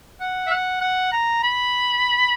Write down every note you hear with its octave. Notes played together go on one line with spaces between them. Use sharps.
F#5
E5
F#5
F#5
A#5
B5